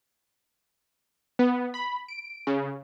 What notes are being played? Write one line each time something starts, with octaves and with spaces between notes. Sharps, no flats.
B3
B5
D7
C#3